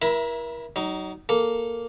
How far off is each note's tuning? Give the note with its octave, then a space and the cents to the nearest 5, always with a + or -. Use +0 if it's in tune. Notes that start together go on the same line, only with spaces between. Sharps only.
E4 +0 A#4 +35 E5 +15
F#3 +35 D#4 +0
A#3 +0 A4 +0